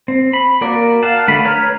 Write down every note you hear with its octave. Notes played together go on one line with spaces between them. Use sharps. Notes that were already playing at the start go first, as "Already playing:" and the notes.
C4
B5
A#3 F#4 A#4 D5
F5 F#5 A5
D3 A3 B5
B4 C#5 A#5 F6